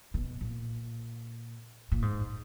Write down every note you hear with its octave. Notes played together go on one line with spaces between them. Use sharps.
B2
A#2
A#2
G#2